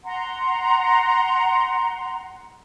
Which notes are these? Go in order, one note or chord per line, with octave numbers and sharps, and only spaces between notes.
F#5 A#5 C6